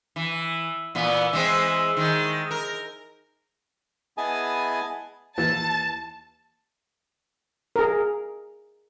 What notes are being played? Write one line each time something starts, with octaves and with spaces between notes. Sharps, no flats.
E3
A#2 E3 B3
E3 G#3 C4
D#3 G#3
A#4
B3 E4 G#4 D#5 G#5 A5
D#2 E3 A5
G#4 A#4